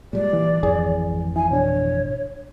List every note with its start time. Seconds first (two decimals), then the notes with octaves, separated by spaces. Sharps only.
0.13 A#2 G3 G#3 D5
0.33 E3
0.63 G#1 F2 E3 G#4
1.36 E4 G#5
1.51 B2 D4 C#5